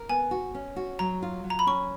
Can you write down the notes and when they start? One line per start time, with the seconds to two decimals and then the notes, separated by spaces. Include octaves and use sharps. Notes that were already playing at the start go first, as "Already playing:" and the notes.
Already playing: A#4
0.09 B3 G#5
0.31 F#4
0.54 C#4
0.76 F#4
0.99 F#3 A#5
1.22 F4
1.44 F#3
1.50 A#5
1.59 B5
1.66 C#4 C#6